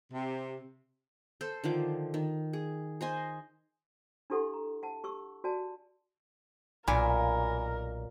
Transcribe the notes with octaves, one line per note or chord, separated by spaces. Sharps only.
C3
A4 C5
D3 D#3 F3 D6
D#3
G#4
C5 D#5 G#5
D4 E4 G4 A4 F#5 C6
A#5
F#5 A5
G4 C#6 E6
F#4 D5 G#5 A5
B1 A#2 A#4 F5 G#5 B5